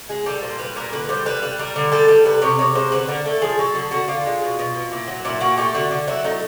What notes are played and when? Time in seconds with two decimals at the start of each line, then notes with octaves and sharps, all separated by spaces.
0.09 G#3 G#4
0.26 G3 A4
0.42 A#2 C5
0.59 G3 B4
0.76 A#2 A#4
0.93 D3 B4
1.09 G3 C5
1.26 G3 B4
1.42 G3 B4
1.59 G3 A#4
1.76 D3
1.92 G3 A4
2.08 G3
2.25 C3 B4
2.42 C3 C#5
2.59 C3 C#5
2.75 G#3 C5
2.92 D3 B4
3.08 D3 A#4
3.25 A3 A4
3.42 F3 G#4
3.59 F#3 A4
3.75 D3 G#4
3.91 D3 F#4
4.08 D3 F4
4.25 G#3
4.42 B2
4.59 B2
4.75 B2
4.91 A#2 E4
5.08 F#3
5.25 A#2 E4
5.41 A#2 F#4
5.57 A3 G4
5.74 D3 F#4
5.91 D3
6.08 F#3 E4
6.24 A2 D#4